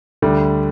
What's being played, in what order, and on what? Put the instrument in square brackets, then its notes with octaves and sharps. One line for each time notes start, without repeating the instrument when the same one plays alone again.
[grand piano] D2 D3 G3 A3